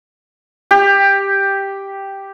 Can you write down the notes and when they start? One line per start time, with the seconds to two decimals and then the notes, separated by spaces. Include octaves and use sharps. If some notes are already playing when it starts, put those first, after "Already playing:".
0.71 G4